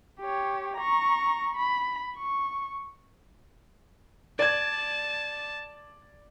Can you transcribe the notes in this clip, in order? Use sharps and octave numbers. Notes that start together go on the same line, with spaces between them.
G4 C#5
A#5 C#6
B5
C#6
D5 A5 G#6